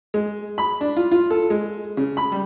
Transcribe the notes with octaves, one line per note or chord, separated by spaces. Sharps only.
G#3
B5
D4
F4
F4
A4
G#3
C#3
B5
G3